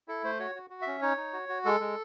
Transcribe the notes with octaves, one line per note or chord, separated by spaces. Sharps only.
E4 A4
A3 C5
F#4 C#5
F#4
F#4
E5
C#4
D#4 C#5
D#4
F#4
F#4
G#3 A4
G#3